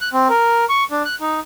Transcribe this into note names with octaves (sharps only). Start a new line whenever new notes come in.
F#6
C4
A#4
C#6
D4
F#6
D#4